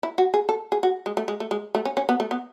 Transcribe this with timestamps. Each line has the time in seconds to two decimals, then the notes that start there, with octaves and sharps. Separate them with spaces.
0.03 E4
0.18 F#4
0.34 G#4
0.49 A4
0.72 G#4
0.83 F#4
1.06 G#3
1.17 A3
1.28 G#3
1.40 A3
1.51 G#3
1.75 A3
1.85 C#4
1.97 C#4
2.09 B3
2.20 A3
2.31 B3